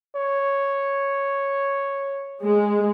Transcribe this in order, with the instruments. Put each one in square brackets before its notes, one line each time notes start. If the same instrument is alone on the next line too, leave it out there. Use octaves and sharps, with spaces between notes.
[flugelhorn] C#5
[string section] G#3